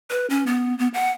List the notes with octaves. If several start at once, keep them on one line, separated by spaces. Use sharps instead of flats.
B4
C#4
B3
B3
F#5